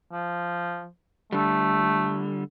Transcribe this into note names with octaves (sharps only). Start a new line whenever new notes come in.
F3
D3 G3 A3